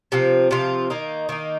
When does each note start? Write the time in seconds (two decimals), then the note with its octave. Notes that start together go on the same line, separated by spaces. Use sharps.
0.12 C3 F3 C4 F4
0.51 C3 F3 C4 F4
0.90 D#3 A#3 D#4
1.29 D#3 A#3 D#4